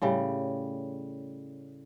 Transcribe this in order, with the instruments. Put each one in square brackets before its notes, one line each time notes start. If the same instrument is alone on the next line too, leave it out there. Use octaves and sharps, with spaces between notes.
[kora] A2 C#3 G3